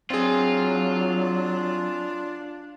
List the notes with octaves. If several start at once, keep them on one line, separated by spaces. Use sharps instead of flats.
F#3 C4 D4 F4 G#4